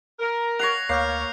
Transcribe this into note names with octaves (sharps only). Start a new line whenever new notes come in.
A#4
C#5 F#5 A#6 C7 F7
D2 A#3 C#5 F6 G6 C7